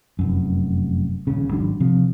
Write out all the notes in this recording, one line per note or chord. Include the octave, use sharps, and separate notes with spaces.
F1 F#2
D#1 C#3
G#1 G#2 F#3 D4
C3 F3 C4